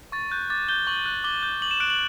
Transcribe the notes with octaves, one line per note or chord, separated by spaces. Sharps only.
C#6 A6
F#6 G6
D6 A6
G6 G7
C#6 F#7
F#6
D6 G7
G6
D6 F#7
E7
F#6 D7
F#7